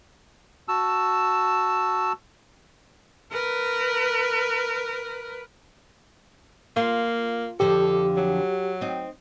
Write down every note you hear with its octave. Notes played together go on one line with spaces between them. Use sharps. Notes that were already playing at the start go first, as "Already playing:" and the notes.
F#4 A5 E6
A#4 B4
A#3 F4
F2 D3 F3 G4 A4
F#3
C4 D#4